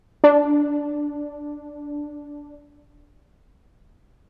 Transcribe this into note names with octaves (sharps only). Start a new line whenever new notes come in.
D4